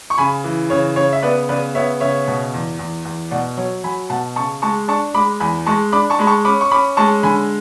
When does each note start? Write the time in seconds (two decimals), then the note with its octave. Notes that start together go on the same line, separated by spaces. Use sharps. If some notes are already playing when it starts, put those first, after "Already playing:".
0.10 C#6
0.18 C#3 G#5 B5
0.44 E3
0.70 C#3 C#5
0.96 C#3 C#5
1.13 E5
1.22 B3 B4 D5
1.49 C#3 B4 D5
1.75 B3 C#5 E5
2.00 C#3 C#5 E5
2.28 B2
2.54 E2
2.79 E2
3.05 E2
3.31 B2 D5 F#5
3.57 F#3 C#5
3.84 F#3 G#5 B5
4.10 B2 F#5 A5
4.36 C#3 A5 C#6
4.62 G#3 A5 C#6
4.88 D4 A5 C#6
5.14 G#3 B5 D6
5.40 E2 G#5 B5
5.66 G#3 A5 C#6
5.92 D4 B5 D6
6.10 A5 C#6
6.19 G#3 B5
6.27 A5 C#6
6.45 C#4 B5 D6
6.61 C#6
6.71 C#4 B5 D6
6.97 G#3 A5 C#6
7.23 D3 G#5 B5